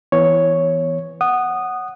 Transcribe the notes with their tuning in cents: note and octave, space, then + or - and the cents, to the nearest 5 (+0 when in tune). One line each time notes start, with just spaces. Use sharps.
E3 +0 B3 +0 C#5 +0
F#5 +0 D#6 -15